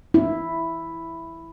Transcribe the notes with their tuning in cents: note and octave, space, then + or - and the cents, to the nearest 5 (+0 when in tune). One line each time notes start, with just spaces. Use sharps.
E4 +0